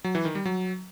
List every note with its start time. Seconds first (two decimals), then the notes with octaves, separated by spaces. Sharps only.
0.04 F#3
0.15 E3
0.25 D#3
0.35 G3
0.45 F#3